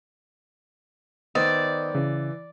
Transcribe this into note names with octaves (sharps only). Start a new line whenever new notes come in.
D#3 B3 C5 D5 D#5 D#6 E6
C#3 E3